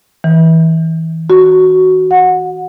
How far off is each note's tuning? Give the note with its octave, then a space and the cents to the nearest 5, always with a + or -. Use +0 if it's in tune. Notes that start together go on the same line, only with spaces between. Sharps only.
E3 -30
F#4 +5
F#5 -20